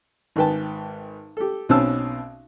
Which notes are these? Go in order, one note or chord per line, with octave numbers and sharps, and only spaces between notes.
G#1 G#2 B4 G5 A5
G4 A4
B1 B2 C4 C#4 A5 E6